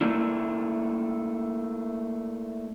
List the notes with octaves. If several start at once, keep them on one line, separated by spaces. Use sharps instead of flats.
A3 A#3 D4 E4